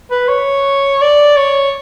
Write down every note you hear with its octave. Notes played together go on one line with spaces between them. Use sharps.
B4
C#5
D5
C#5